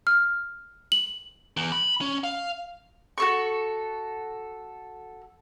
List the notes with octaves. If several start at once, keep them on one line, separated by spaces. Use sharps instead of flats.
F6
F#7
E2
B5
C#4
F5
F#4 A4 C#6